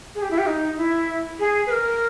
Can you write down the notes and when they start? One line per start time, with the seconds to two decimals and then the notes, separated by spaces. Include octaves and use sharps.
0.15 G#4
0.22 G4
0.31 E4
0.38 G4
0.47 D#4
0.77 E4
1.40 G#4
1.66 B4
1.71 A#4